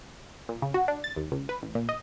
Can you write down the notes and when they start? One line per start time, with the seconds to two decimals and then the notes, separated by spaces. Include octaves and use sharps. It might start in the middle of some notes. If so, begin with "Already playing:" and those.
0.49 A#2
0.62 C#3
0.74 F#4
0.88 D4
1.04 A6
1.16 D#2
1.32 C#2
1.49 B4
1.62 A1
1.75 A#2
1.89 D#5